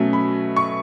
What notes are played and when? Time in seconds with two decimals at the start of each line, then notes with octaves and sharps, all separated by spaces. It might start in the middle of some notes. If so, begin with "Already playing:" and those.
Already playing: B2 F#3 A3 C#4
0.13 B5
0.56 C#6